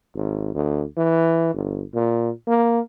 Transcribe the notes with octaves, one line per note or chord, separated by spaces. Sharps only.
G#1
D2
E3
G1
A#2
A#3